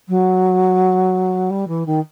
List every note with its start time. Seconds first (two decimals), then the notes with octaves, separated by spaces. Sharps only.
0.08 F#3
1.50 G3
1.67 E3
1.86 D#3